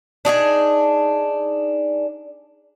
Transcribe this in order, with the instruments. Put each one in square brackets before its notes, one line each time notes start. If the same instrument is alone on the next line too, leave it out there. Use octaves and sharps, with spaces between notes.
[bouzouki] D4 D#4 F#4 G#4